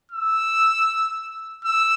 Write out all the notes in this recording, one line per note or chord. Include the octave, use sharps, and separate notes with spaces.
E6
E6